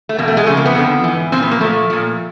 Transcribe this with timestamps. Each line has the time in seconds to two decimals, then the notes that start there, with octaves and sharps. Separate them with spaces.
0.09 A3
0.18 E2 B2 A#3
0.28 A3
0.37 G#3
0.46 F2 C#3 F3 A3
0.57 A#3
0.66 B3
0.75 F2 D3 F3
1.04 G#2 E3
1.32 A#2 F3 C4
1.42 B3
1.51 A#3
1.61 A#2 F3 A3
1.90 A#2 F3